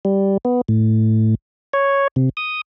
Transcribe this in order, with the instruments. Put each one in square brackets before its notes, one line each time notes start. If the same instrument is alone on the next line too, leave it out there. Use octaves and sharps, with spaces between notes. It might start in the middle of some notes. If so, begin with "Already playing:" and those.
[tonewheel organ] G3
B3
A2
C#5
C3
D#6